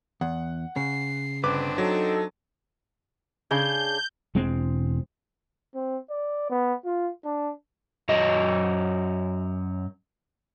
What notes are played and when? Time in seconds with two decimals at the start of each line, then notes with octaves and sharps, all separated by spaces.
0.21 E2 F#5
0.76 C#3 C7
1.43 G1 C4 D4 B4 D6
1.78 F#3 D#4 A4
3.51 C#3 D4 G#4 G6
4.35 E1 G#3 C4
5.75 C4
6.10 D5
6.50 B3
6.85 F4
7.25 D4
8.09 F#2 F#3 D#5